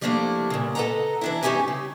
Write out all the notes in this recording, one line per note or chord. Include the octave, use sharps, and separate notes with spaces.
F3 G3 A3 A#3 D4 E4
A#2 C#3
A4 B4 D#5 F#5 A#5
E3 D4 E4
G2 C#4 D#4 G4 E5 G#5
C#3